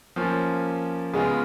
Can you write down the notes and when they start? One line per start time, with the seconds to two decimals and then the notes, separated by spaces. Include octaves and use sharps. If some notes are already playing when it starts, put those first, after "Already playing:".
0.16 F3 A#3 C#4 F4
1.14 C#3 G#3 B3 F4